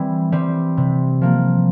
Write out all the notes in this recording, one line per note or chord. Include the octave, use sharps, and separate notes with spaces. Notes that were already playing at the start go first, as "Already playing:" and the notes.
Already playing: E3 G3 C4 G5
G3 C4
C3
F3 A#3